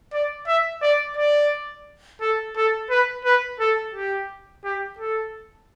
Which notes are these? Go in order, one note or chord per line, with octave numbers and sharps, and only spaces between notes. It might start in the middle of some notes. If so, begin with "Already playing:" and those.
D5
E5
D5
D5
A4
A4
B4
B4
A4
G4
G4
A4